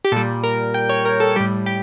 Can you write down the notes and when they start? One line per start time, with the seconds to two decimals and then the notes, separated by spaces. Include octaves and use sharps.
0.05 G4
0.12 A#2 G3 A4
0.43 A#4
0.74 G5
0.89 C#5
1.05 A#4
1.20 A4
1.36 A2 G3 G4
1.66 G4